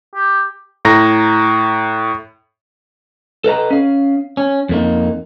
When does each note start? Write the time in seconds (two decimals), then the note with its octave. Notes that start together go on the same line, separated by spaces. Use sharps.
0.15 G4
0.85 A2 A#5 A#6
3.44 A4 B4 D#5 A#5
3.70 C#4 F5
4.37 C#4
4.69 F2 A#3 D#4